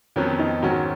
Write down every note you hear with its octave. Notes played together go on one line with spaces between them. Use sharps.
F2 D#3 F#3 B3 C#4
D#4
G#2 D#3 F#3 C#4 F#4